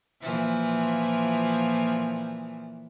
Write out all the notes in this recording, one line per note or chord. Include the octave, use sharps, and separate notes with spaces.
A#2 E3 F3